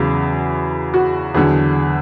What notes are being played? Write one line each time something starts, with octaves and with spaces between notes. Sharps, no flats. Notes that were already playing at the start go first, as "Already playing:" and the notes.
Already playing: E2 C#3 F#3 G#4
F#4
E2 D3 F#3 G#4